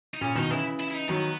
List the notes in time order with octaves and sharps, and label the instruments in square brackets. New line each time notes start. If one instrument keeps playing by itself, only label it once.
[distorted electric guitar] D#4
[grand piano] A#2 C#3 [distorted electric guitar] C#4
[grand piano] B2 D#3 [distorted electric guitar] D#4
[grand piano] C#3 E3 [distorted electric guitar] E4
[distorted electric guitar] E4
E4
D#4
[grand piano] D#3 F#3 [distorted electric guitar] B3